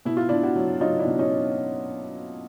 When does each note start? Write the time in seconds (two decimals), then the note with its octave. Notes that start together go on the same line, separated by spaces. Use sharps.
0.05 B2 E4
0.17 F4
0.29 B2 D4 E4
0.43 E4 F#4
0.56 F#3
0.81 F#3 D#4 F4
0.99 D4 E4
1.07 B2
1.19 C#4 D#4